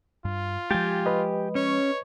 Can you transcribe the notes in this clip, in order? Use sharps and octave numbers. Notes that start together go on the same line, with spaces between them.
G2 F4
F3 G#3 G4 G5 G#5 A6
B4 D#5
C#4 C#5